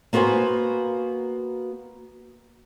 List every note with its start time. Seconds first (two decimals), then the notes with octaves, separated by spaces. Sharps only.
0.13 A#3 B3 F#4 C5 F#5 G#5